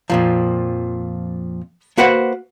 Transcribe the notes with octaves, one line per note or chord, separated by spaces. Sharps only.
F2 A#2 F3
A#3 F#4 B4 C5 F#5